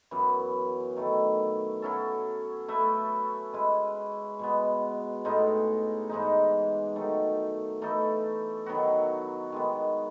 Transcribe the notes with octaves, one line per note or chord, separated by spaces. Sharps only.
F#2 E3 B3
D#3 A3 E4
F#3 C#4 E4 A4
A3 E4 B4 E5
G#3 C#4 E4 B4
B2 G#3 B3
A2 G#3 B3 D#4
G#2 E3 G#3 D#4
D#3 F#3 A3 D#4
E3 A3 D#4 A4
D#3 F#3 B3 F#4
D#3 G#3 B3